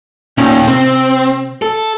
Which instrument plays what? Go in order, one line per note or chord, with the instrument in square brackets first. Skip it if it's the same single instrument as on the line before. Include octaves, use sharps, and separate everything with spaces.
[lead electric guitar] D#2 D#3 [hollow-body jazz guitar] A#2 C#4
[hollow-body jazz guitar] C3 [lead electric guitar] C4
[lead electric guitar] A4